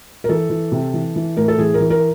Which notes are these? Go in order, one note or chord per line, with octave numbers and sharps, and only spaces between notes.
A#4
E3 A4
E3
C3
E3
E3
A2 A#4
A4
E3 G#4
A#4
E3
A#4